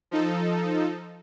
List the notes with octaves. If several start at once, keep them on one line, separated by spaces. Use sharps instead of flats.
F3 D#4 A4